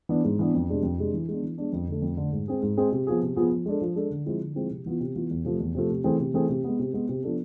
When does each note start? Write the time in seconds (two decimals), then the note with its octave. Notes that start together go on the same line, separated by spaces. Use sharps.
0.09 E3 B3 D4
0.24 G#2
0.39 E3 B3 D4
0.54 F2
0.69 C3 G#3 D4
0.83 F2
0.98 C3 G#3 D4
1.14 E3
1.29 G#3 B3 D4
1.43 E3
1.58 G#3 B3 D4
1.73 F2
1.88 D3 A3
2.02 F2
2.17 D3 A3
2.32 G#2
2.48 G#3 C4 G#4
2.62 G#2
2.77 G#3 C4 G#4
2.92 C3
3.07 F3 B3 F4 G#4
3.22 C3
3.36 F3 B3 F4 G#4
3.52 F3
3.66 G#3 D4 A4
3.81 F3
3.96 G#3 D4 A4
4.10 D3
4.26 F3 G#3 C4 E4
4.41 D3
4.55 F3 G#3 C4 E4
4.70 C3
4.86 E3 B3 F4
5.00 C3
5.16 E3 B3 F4
5.31 E2
5.44 C3 F3 A3
5.60 E2
5.75 C3 F3 A3
5.90 C3
6.04 E3 A3 C4 G#4
6.20 C3
6.34 E3 A3 C4 G#4
6.49 C3
6.64 G#3 B3
6.79 C3
6.93 G#3 B3
7.09 C3
7.23 F3 B3 D4 A4